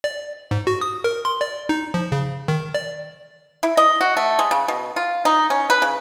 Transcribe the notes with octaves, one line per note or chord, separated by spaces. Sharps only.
D5
G#2
F#4
D#6
A#4
C6
D5
D#4
F3
C#3
D#3
D5
E4
D#5
F#4
A3
G#3
C#3
B2
F4
D#4
C#4
B4
C#3